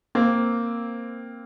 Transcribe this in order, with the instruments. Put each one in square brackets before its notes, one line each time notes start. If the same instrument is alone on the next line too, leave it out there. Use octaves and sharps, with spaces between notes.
[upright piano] A#3 C4